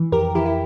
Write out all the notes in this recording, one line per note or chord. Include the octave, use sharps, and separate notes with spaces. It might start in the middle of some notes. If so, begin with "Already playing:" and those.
Already playing: E3
F2 G4 A#4
E3 E4 G4
E4